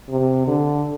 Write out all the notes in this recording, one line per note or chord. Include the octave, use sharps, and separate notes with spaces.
C3
D3